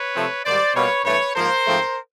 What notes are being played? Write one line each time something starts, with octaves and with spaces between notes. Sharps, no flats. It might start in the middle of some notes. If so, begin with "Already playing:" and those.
Already playing: B4 C#5
C3 F3 A3 C4
G#2 D#3 G3 C5 D5
B2 G3 A#3 B4 C#5
G2 E3 A3 B4 C#5
G#2 F3 A#3 A#4 C5
G#2 F3 A3 C4